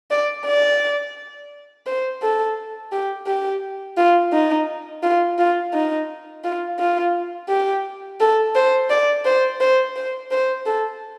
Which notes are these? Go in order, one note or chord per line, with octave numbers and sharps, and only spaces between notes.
D5
D5
C5
A4
G4
G4
F4
D#4
F4
F4
D#4
F4
F4
G4
A4
C5
D5
C5
C5
C5
C5
A4